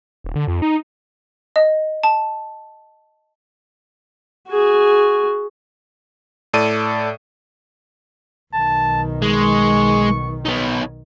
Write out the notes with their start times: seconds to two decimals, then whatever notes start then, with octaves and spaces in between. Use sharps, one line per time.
0.24 D#1
0.35 D3
0.47 F2
0.62 D#4
1.56 D#5
2.03 A5
4.48 F#4 G#4
6.53 A2 A4 D5 D#7
8.54 B1 D#3 A5
9.22 G#3 C#6
10.45 B3 D#4 C#5